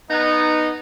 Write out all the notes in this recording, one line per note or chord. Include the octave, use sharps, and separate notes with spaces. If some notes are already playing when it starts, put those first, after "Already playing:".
B3 D#4